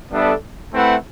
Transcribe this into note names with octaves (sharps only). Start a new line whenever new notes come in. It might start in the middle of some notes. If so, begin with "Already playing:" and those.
G3 B3 D4 A4 E5
A3 C4 E4 B4 F#5